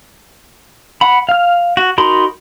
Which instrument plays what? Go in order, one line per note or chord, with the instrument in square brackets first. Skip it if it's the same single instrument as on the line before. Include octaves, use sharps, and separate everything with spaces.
[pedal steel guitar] F#5 B5
F5 F6
F#4
D#4 F#4 A#4 B5 C6